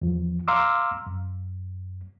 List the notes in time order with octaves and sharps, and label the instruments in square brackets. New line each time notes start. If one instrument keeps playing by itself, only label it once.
[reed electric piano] E2 F3
F5 A#5 C6 D6 E6 F6
F#2